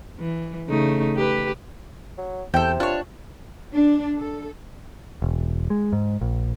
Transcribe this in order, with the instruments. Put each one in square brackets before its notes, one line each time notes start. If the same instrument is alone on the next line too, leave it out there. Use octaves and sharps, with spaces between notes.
[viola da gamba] E3
C#3 A3 D#4
G4 B4
[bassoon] F#3
[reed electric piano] E2 [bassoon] C3 [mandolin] A4 G5
[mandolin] D4 C#5 [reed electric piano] F4
[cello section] D4
A4
[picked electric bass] E1
G#3
G#2
A#1